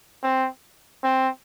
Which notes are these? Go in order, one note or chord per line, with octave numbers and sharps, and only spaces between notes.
C4
C4